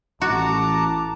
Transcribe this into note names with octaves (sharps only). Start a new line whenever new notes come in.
A1 F#4 A5 A#5 D6